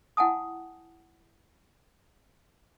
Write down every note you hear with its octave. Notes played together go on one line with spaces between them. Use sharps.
E4 F#5 G#5 A5 D#6